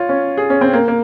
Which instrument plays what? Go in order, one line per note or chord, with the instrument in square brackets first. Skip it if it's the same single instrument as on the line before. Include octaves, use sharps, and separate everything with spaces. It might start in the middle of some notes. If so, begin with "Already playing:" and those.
Already playing: [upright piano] F4 C#5
C#4
G#4
C#4
C4
A#3
A#3